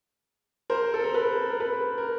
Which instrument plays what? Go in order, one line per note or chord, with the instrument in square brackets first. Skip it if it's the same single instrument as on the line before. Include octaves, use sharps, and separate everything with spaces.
[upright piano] A#4 C5
A4
A#4
A4 B4
A#4
A4 B4
A#4